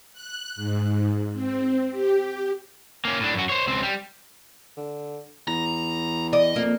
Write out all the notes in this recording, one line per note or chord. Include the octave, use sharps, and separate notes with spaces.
F#6
G#2
C4
G4
A#3 C#4
A2 D4
F#2 F#4
C5 C#5
C#2 C4
G3
D3
E2 A#5
D5 D#5
F2 A#3